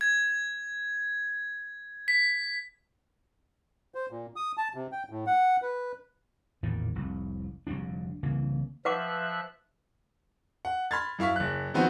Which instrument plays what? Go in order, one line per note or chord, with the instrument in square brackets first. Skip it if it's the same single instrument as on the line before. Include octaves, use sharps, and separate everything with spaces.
[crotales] G#6
B6
[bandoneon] C5
A#2
D#6
A5
C3
G5
A2
F#5
B4
[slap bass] A1 E2 A#2 D#3
F1 C2
F1 D2 G3 D4
C2 C#3 E3 A#3
[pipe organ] F3 E5 F#6 [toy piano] B4 F#5 D6
[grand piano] F#5
B5 C6 F6 G#6 A6
F#2 E4 F5 C#6 B6
F#1 F#6
D#3 F3 B3 C4 F#4